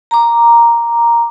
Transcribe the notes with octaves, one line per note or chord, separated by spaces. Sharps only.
A#5 D6